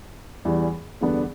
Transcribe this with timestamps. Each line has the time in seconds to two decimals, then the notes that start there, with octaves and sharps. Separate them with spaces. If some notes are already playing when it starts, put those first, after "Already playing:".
0.45 E2 E3 G3
1.01 E2 D3 G3 B3 D4